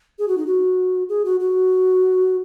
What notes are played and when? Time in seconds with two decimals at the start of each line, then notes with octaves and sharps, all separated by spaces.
0.19 G#4
0.28 F#4
0.37 D#4
0.47 F#4
1.09 G#4
1.25 F#4
1.40 F#4